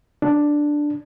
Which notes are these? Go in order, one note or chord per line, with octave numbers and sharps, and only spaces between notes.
D4